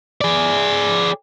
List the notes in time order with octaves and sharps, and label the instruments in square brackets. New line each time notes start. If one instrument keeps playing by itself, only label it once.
[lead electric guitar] G#4 D5